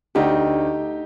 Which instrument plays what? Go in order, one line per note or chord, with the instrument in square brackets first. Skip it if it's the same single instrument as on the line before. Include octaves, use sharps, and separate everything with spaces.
[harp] D2 [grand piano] D#4 G4